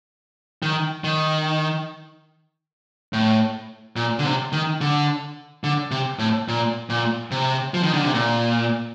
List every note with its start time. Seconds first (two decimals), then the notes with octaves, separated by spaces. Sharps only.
0.62 D#3
1.04 D#3
3.13 A2
3.96 A#2
4.19 D3
4.25 C3
4.52 D#3
4.81 D3
5.64 D3
5.91 C3
6.19 A2
6.48 A#2
6.90 A#2
7.31 C3
7.74 F3
7.83 D#3
7.94 D3
8.04 C3
8.14 A#2